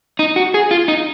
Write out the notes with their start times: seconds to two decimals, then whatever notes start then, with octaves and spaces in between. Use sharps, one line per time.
0.19 D#4
0.36 F#4
0.54 G#4
0.71 F4
0.88 D#4